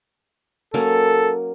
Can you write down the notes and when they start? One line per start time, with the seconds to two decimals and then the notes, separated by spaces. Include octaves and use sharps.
0.74 F#3 A#3 C#4 A4